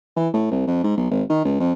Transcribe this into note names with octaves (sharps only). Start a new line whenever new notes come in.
E3
A2
C2
F2
G#2
B1
G#1
D#3
C#2
F2